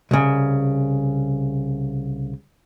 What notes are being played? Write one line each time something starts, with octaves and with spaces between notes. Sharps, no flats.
C2 C#3